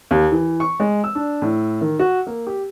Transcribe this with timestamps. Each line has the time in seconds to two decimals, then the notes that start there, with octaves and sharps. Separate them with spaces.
0.11 D#2
0.32 E3
0.60 C#6
0.80 G#3
1.04 E6
1.15 D4
1.42 A2
1.81 D#3
1.99 F#4
2.27 A#3
2.47 G4